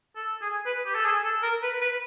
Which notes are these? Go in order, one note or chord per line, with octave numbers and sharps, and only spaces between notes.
A4
G#4
B4
G4
A4
G#4
A4
A#4
B4
B4